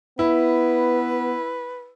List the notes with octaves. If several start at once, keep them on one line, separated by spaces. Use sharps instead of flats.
B3 E4 B4